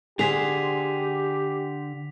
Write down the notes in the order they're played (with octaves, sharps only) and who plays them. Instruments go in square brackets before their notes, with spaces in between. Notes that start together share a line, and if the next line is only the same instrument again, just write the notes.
[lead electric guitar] D3 C5 [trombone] G4 [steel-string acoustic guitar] G#4 [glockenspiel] B6 F7